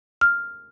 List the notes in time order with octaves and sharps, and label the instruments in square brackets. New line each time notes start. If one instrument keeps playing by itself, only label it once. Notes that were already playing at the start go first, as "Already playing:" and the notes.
[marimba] F6